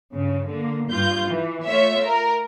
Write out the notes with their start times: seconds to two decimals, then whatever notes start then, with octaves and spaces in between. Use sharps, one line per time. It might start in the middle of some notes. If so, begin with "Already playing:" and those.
0.14 G2 C#3
0.49 D3 A#3
0.90 G2 F4 G6
1.28 E3
1.67 A3 F4 C#5 E5
2.06 A#4